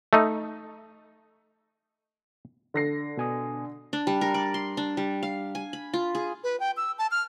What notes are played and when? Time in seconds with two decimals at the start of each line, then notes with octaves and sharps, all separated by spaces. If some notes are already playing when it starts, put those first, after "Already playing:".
0.13 A3 D#4
2.74 D3 A#6 C7
3.17 B2 G#5 D#6
3.93 D4
4.07 G3
4.21 A#4
4.34 D5
4.54 C6
4.77 D4
4.97 G3
5.23 F5
5.55 G#5
5.73 B5
5.93 F4
6.15 G#4
6.44 B4
6.60 G5
6.77 E6
6.98 A5
7.11 F6